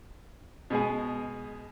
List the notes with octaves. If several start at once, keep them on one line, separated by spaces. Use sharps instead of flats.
B2 G#3 G#4